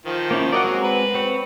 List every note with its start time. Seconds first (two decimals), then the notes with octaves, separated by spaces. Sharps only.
0.06 D#3 F3
0.31 A#3 C#4 E4
0.52 F#3 A#4 D5 D#5 F#5
0.64 G#3 C4 F#4
0.83 B4
1.14 C4 C#5